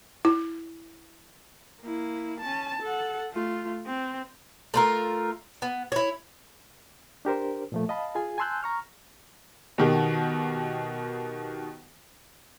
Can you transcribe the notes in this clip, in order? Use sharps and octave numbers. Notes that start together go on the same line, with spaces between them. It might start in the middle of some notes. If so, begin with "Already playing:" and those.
E4
A#3 E4
C#4 A5
A4 F#5
A3 F4
C4
A3 F4 A#4
B3
E4 C#5
D4 G4 A#4 C5
A#2 F3 A3
D#5 F5 A5 B5
F4 G#4 G#5
G#5 A5 C6 E6 F#6 G6
A#5 C#6 F6
B2 D#3 G4